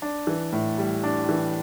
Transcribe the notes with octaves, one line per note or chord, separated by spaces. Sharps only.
D4
E3
A2
G3
D4
E3